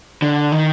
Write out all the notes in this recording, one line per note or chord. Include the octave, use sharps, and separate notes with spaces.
D3
D#3